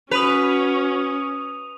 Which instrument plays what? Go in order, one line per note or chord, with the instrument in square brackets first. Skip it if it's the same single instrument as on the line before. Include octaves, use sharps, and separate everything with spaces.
[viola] C#4 [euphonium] F#4 [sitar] B4 [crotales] D#6 D#7 F7